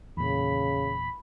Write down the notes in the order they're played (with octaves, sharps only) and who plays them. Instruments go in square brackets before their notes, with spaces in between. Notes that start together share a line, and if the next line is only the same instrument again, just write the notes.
[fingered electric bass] E2 A#2 [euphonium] C#3 [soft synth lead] B5